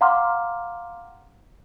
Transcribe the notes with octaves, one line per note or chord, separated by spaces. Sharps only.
F5 F#5 A#5 C6 D6 F6